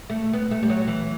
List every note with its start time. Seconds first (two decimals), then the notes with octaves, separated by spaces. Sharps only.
0.09 A3
0.33 B3
0.51 A3
0.63 G3
0.70 F#3
0.87 E3